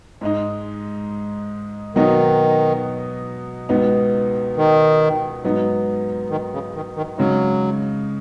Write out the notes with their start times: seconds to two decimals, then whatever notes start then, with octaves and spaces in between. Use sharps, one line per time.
0.21 G#2 G#3 D#4
1.95 B2 D#3 F#3 B3 D#4
3.69 C#2 B2 B3 D#4
4.56 D#3
5.44 G#2 F#3 B3 D#4
6.30 D#3
6.53 C#3
6.75 D#3
6.96 D#3
7.18 C#3 F#3 G#3 D#4